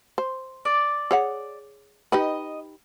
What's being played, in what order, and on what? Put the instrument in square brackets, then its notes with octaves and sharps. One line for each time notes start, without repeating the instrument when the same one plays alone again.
[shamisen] C5
[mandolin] D5
[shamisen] G#4 C#5 F#5
[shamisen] D#4 G4 B4 [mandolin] D#5